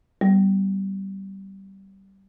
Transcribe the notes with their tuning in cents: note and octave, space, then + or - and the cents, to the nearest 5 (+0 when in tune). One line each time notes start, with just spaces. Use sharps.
G3 -15 B3 +0